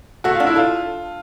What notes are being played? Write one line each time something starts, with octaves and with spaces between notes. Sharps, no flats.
A3 F#4
F4
D4
E4
F4 A4